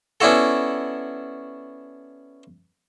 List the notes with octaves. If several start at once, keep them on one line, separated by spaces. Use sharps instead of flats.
B3 C#4 D4 E4 F#4 A4